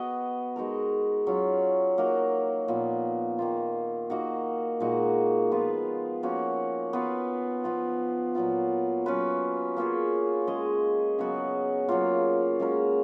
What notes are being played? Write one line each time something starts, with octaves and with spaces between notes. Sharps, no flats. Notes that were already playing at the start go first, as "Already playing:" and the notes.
Already playing: B3 F#4 B4 D#5
G#3 D#4 F#4 A#4
F#3 C#4 F4
A#3 D#4 F#4 A#4
A#2 F3 B3
D#3 A#3 F4
A#3 D#4 F#4
A#2 G#3 D#4 F#4
F3 B3 F4 B4
F3 A#3 C#4 F#4
B3 F4 B4
F3 B3 F4
A#2 F#3 B3 F4
F#3 C#4 F4 B4
A#3 C#4 F4 G#4
G#3 C#4 G#4 D#5
C#3 F#3 B3 F#4
C#3 F#3 A#3 F4
G#3 C#4 F#4 A#4